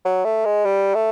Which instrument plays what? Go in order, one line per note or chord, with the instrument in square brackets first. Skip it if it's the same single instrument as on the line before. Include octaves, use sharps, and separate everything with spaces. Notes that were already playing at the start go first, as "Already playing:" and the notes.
[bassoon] F#3
A3
G#3
G3
A3